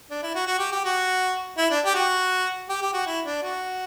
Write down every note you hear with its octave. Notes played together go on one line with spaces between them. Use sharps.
D4
E4
F#4
F#4
G4
G4
F#4
E4
D4
G4
F#4
G4
G4
F#4
E4
D4
F#4